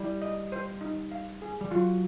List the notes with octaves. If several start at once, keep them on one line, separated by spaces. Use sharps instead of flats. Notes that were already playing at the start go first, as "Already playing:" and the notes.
Already playing: G3 E4
D#5
C5
D#4
F5
G#4
G3
F#3 F4